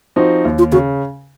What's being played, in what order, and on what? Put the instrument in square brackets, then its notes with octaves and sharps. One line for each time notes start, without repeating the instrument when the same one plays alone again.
[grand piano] F3 C4 D#4 F#4
D#2
[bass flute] F4
[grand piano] C#3 [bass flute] F#4